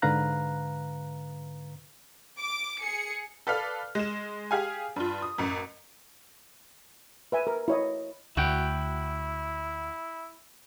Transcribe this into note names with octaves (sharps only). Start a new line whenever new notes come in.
G#2 D3 B4 F5 A#5 F#6
D6
G#4 C#7
A4 B4 D5 F5 F6
G#3 E7
G4 G#4 F5 G#5
G2 F4
D#6
A1 F#2
B4 E5 G#5
A#4
E4 C#5 D#5
D2 E4 F#4 F#5 G5